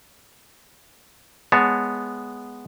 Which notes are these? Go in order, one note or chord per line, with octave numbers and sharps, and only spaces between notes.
G#3 B3 C#5 A5